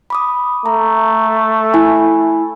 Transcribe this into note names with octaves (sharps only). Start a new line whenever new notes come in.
B5 D6 D#6
A3 A#5
E4 G#5 B5